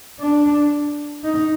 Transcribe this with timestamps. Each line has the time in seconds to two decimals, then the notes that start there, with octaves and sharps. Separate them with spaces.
0.20 D4
1.24 D#4